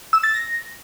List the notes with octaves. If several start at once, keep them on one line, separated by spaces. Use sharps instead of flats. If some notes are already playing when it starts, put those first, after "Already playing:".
E6
A6
A#6